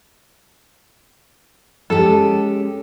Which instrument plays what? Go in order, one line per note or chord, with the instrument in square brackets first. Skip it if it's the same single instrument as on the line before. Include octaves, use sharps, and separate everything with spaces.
[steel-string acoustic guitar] G#3 C#4 G4 [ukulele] A4